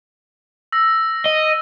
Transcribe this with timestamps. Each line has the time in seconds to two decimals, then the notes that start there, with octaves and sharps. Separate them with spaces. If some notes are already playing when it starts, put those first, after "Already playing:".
0.72 E6 A#6
1.25 D#5